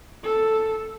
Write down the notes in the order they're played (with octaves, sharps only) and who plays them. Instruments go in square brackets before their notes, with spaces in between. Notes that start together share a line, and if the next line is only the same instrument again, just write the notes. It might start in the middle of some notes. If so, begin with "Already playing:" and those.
[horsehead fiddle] A4